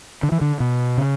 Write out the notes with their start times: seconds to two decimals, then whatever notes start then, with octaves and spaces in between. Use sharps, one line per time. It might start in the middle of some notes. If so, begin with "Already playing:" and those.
0.23 D3
0.32 E3
0.41 D3
0.60 B2
0.98 C#3